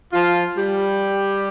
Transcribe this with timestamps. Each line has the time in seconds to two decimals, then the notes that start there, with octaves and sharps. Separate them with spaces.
0.13 F3 F4
0.57 G3 G4